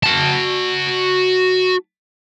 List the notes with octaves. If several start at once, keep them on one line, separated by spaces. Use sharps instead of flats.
F#4 A5